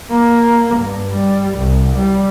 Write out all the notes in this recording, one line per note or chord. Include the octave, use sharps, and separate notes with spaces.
A#3
G2
G3
C2
G3